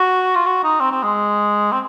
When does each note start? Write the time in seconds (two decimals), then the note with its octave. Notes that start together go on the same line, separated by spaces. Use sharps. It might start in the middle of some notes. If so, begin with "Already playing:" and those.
Already playing: F#4
0.35 F4
0.46 F#4
0.64 D#4
0.80 C4
0.91 C4
1.03 G#3
1.72 C4